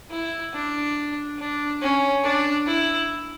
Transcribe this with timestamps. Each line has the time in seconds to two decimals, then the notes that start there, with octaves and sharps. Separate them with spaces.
0.11 E4
0.54 D4
1.39 D4
1.82 C#4
2.23 D4
2.67 E4